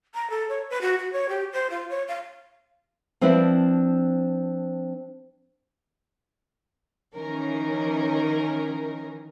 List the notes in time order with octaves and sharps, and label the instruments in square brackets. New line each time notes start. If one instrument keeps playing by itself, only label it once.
[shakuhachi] A#5
A4
C#5
B4
F#4
F#4
C#5
G4
C5
F4
C#5
F5
[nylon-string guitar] F3 C4 D4 E4 B4 D5
[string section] D#3 E3 C#4 A#4